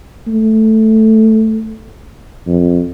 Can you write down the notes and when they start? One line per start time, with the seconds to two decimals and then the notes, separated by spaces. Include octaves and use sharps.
0.28 A3
2.47 F2